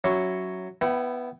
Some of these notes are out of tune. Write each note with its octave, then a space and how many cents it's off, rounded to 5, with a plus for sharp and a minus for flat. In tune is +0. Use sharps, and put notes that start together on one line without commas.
F#3 +0 C#4 +0 E4 +0
B3 +0 E4 +10 G5 -30